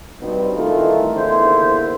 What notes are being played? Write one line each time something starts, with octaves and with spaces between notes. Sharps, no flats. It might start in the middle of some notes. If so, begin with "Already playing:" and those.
G2 B2 G3 B3 C4 D#4
G#1 D#3 E3 A3 D#4 F4
E2 D3 D#3 A#3 E4 C5